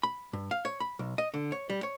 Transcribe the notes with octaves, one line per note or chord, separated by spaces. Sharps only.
B5
G2
F5
C#5
B5
B1
D#5
D3
C#5
G3
C#5